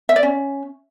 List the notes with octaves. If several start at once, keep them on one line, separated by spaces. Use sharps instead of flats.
E5
D5
C#4